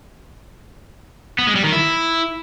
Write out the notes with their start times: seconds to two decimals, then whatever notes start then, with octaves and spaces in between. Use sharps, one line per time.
1.39 B3
1.47 G#3
1.55 G3
1.64 D#3
1.72 E4